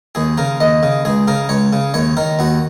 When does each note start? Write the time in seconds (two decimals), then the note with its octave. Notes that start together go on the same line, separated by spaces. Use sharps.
0.15 D#2 G#4
0.38 C#3 A#4
0.60 D#2 D#5
0.83 C#3
1.05 C#2 G#4
1.28 C#3 A#4
1.49 C#2 C#5
1.73 C#3
1.94 D#2 C#5
2.17 D#3 A#4
2.39 D#2 F#4